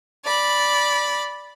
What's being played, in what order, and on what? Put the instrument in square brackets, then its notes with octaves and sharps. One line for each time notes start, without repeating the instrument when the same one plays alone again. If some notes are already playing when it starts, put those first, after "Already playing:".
[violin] D5 B5